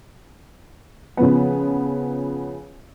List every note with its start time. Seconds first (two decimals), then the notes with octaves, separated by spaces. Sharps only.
1.17 C#3 F3 B3